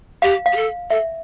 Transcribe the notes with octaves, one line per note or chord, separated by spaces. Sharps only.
G4 F5
F5
G4
A4
A4 E5